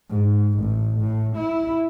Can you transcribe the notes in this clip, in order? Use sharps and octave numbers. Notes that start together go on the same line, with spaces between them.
G#2
A1
A2
E4